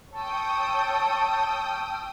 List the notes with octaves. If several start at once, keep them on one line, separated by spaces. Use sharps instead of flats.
C#5 G5 A5 C#6 D#6 E6